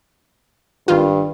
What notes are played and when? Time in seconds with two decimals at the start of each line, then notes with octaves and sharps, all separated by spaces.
0.88 G#1 G2 D#3 F4